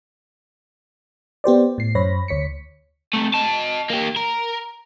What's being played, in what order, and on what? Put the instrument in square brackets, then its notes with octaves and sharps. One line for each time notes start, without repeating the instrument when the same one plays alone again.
[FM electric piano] B3 G4 C5 D5
A2 C7
F#2 C5 C#5 B5 A#6
D2 C#5 B6 C#7
[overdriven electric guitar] C3 A3
D#5 A5
A#3 G4
A#4